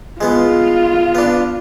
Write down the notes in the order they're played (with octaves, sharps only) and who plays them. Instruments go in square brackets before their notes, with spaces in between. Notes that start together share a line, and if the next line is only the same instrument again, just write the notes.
[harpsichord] G#3 B3 [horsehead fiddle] F4
[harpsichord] B3 D4